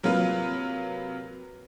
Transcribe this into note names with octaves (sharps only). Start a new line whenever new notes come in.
C3 F#3 A#3 F4 B4